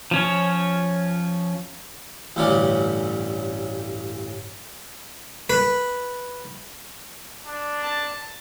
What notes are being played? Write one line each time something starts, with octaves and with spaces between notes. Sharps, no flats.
F3 C#4 C#5
A1 D2 G2 E3 C#4 D5
B4
D4
A5